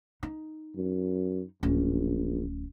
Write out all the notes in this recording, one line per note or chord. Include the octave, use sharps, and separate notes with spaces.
D#4
F#2
D1 A#1 C#4